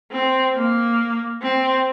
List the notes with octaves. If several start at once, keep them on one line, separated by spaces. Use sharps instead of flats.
C4
A#3
C4